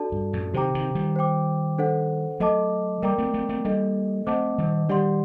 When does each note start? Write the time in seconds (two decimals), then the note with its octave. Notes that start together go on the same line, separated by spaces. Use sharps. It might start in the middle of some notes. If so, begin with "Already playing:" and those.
Already playing: D4 F#4 A4 D5 A5
0.12 G2
0.33 F#2 A2
0.54 C3 D#3 G4 C5 G5 A#5 D6
0.75 C3 D#3
0.95 D#3 G3
1.16 C5 G5 D6
1.78 D4 A4 C5 F#5
2.40 F#3 A3 A4 D#5 A5 D6
3.02 G3 A#3 A#4 D5 G5 A#5 D6
3.18 A3 C4
3.34 A3 C4
3.49 A3 C4
3.65 G3 A#3 D4 A4 D#5
4.26 A3 C4 C5 D#5 F#5 A5 D6
4.58 D#3 G3
4.89 D#3 G3 D4 G4 D5 F#5 C6